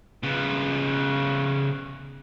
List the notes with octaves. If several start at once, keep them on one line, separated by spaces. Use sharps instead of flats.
C#3 B3